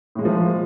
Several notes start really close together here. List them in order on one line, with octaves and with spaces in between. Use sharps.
A2 G#3 A#3 F3